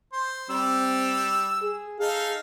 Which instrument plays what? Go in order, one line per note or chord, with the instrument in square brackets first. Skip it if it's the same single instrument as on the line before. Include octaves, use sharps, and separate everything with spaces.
[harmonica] C5
[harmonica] G3 E6 [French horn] C4
[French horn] G#4
[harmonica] D#4 A4 F5 [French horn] G#4